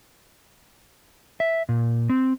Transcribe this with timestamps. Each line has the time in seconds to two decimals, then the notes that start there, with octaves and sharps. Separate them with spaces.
1.40 E5
1.69 A#2
2.09 C4